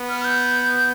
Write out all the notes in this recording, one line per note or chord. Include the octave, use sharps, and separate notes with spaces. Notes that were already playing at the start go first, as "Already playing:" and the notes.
Already playing: B3
F6
F6
G6